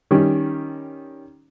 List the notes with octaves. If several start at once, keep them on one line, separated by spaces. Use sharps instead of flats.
D#3 G3 C#4